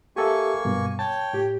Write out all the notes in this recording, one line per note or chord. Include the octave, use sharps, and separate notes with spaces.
A#3 G4 A4 E5 G#5 C#6
G2 B2
C#5 G5 A5
A2 G4